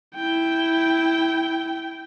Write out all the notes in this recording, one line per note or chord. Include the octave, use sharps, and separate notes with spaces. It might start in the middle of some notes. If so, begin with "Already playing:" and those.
E4 G5